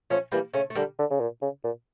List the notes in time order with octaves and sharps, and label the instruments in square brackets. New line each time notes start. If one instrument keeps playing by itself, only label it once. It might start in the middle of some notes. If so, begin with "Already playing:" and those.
[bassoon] F3 [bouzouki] A3 C#4
[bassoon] E3 [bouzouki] G3 A#3
[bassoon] C#3 [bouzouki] A3 C#4
[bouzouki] A3
[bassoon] D3 [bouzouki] G3 A#3
[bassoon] D3
C#3
A#2
C#3
A#2